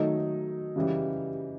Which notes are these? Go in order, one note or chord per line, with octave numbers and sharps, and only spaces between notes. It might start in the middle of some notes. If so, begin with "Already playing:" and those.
Already playing: D#3 F#3 A3 D#4
C#3 E3 G3